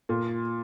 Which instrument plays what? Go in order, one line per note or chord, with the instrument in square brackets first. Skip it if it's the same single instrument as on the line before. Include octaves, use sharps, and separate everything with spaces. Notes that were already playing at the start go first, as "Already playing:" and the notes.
[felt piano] A#2